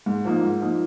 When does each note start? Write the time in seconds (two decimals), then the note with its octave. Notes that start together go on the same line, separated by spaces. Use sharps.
0.06 G#2
0.25 F3 A#3 D#4
0.43 G#2
0.61 F3 A#3 D#4